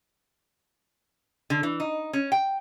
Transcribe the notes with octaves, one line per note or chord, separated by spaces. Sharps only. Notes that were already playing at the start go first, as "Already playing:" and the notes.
D3
E3
D#4
C#4
G5